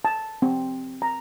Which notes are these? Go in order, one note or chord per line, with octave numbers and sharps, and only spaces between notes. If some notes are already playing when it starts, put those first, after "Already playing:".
A5
C4
A#5